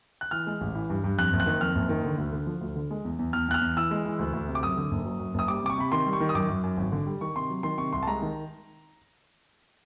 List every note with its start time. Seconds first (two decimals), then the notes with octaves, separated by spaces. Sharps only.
0.21 F#6
0.31 E3 F6
0.47 G#3
0.61 A1
0.75 E3
0.90 G2
1.04 G2
1.18 F2 F#6
1.33 F#1
1.40 F#6
1.46 D#3
1.61 F2 F6
1.75 F#1
1.89 D#3
2.05 D3
2.18 D2
2.33 D3
2.47 F3
2.61 D2
2.76 D3
2.91 G#3
3.05 E2
3.19 E2
3.33 E2 F6
3.48 E2 F#6
3.54 F6
3.61 E2
3.77 E3 E6
3.91 G#3
4.05 E3
4.19 D2
4.33 D2
4.48 C3
4.55 D6
4.63 F#2 D#6
4.77 D3
4.91 F#1
5.05 F#3
5.19 F#2
5.34 F#1 D#6
5.48 G3 D6
5.63 C3 D6
5.69 C#6
5.78 C3 B5
5.92 D#3 C6
6.06 G3
6.13 C#6
6.20 D#3
6.29 D#6
6.34 F#2 D6
6.48 F#2
6.64 F#2
6.77 G#1
6.92 D3
7.06 G3
7.21 D#3 C#6
7.36 C3 C6
7.49 F#3
7.63 D#3 C6
7.78 C3 C#6
7.93 C2 C6
8.03 A5
8.07 G#3 A#5
8.22 D#3